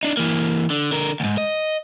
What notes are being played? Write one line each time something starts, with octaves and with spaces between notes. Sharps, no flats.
D4 D#4
E3 A#3
D3
D3 A#4
D2 G#2
D#5